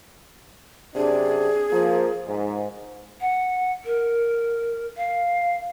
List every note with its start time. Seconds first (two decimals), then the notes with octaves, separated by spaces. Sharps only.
0.96 F#2 C3 D4 G#4
1.70 F3 A#3
2.28 G#2
3.21 F#5
3.85 A#4
4.97 F5